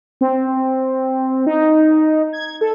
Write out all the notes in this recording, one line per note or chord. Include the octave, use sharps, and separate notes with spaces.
C4
D#4
G#6
A4